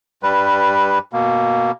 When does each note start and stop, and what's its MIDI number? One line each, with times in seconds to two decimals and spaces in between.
0.23 0.99 43
0.23 0.99 55
0.23 0.99 71
1.13 1.71 47
1.13 1.71 58